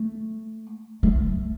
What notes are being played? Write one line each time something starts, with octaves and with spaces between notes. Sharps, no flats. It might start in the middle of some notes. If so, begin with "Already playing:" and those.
Already playing: A3
A3